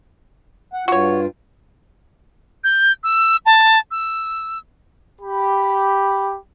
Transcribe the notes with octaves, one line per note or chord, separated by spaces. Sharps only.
F#5
G2 F4 F#4 C#5
G6
E6
A5
E6
G4 B5